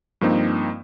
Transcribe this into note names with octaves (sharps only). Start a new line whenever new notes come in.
G2 F3 A#3 C4 D#4